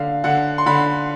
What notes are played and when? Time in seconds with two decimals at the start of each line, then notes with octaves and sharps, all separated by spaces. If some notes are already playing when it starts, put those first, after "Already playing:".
Already playing: D3 F5
0.24 D3 F#5
0.58 C6
0.66 D3 B5